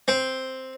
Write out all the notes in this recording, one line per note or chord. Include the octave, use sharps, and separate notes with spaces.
C4